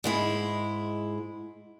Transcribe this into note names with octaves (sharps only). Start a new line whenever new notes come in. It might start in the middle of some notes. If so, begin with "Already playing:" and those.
G#2 G#3 E4